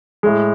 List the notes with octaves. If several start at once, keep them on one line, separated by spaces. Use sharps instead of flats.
A2 G#3